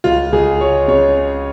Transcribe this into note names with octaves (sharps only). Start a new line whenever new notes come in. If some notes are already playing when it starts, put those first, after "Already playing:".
C#2 F4
C#2 G#4
G#3 C#5
C#3 C#5